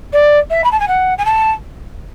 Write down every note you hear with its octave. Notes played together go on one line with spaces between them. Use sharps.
D5
E5
B5
A5
G#5
F#5
G#5
A5